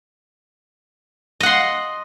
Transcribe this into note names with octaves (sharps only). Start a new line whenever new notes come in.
D#5 F#5 C6